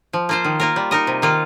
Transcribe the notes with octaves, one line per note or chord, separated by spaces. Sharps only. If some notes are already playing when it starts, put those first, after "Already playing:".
F3
A#3 F4 C5
D#3
A#3 F4 A#4
G3
D#4 A#4 D#5
C3
D#3 A#3 F4